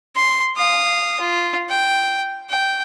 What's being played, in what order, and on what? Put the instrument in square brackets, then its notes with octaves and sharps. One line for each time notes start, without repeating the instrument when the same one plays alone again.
[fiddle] C6
F5 D#6
F4
G5
G5